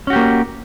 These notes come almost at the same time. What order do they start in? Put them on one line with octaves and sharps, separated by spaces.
C#4 F#4 G4 A#3